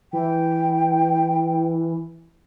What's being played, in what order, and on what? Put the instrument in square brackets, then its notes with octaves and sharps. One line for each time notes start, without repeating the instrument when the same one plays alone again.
[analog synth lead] E3 [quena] G5